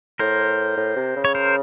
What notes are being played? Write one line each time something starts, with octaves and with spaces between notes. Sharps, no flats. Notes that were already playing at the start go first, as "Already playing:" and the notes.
A2 A#4 C5
A2
C3
C#3
C#5
A#4 C5